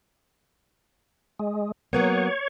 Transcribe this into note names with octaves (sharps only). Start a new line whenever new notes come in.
G#3
F#3 A#3 B3 C#5